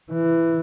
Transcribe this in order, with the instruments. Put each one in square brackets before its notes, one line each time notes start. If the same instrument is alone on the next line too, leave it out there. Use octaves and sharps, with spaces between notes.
[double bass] E3